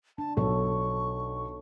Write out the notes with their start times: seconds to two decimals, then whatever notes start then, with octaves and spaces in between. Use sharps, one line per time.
0.18 D4 A5
0.37 B1 F4 A4 C#5 C#6